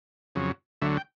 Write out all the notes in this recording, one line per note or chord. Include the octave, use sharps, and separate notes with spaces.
F2 C#3 F#3
D2 D3 F#3 E5
G5